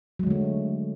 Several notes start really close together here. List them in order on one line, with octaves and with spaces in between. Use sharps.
F#3 G#3 D3 A3